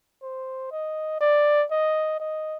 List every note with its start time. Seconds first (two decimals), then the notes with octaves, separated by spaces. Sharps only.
0.23 C5
0.72 D#5
1.20 D5
1.71 D#5
2.20 D#5